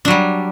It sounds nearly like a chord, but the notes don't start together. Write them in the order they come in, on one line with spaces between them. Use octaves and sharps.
D4 F#3 G3